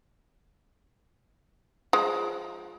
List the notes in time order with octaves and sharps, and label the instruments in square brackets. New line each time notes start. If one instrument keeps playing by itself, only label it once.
[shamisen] F3 G#3